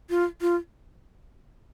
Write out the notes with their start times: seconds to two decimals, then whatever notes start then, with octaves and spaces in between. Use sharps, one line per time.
0.10 F4
0.41 F4